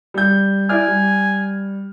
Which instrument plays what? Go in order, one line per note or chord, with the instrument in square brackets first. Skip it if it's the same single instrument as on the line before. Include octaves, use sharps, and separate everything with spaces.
[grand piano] G3 G6
[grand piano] E4 D5 F6 [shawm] G#5
[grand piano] G3